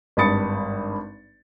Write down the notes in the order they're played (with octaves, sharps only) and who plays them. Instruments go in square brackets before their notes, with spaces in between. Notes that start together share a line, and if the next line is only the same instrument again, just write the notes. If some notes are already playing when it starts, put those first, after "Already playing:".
[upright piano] G#1 G2 B5 D#6 A6 C#7